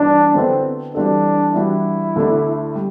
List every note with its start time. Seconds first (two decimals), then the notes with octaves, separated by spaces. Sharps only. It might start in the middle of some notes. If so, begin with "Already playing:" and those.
Already playing: G2 E3 B3 D4 F#4
0.35 D3 F#3 B3 C4 E4 A4
0.95 E3 G3 C4 D4 F#4 A4
1.55 E3 G3 D4 E4 F#4
2.16 D2 D3 A3 D4
2.75 G3